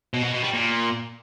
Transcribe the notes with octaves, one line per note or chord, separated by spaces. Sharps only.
B2
B2
B2
G3
A#2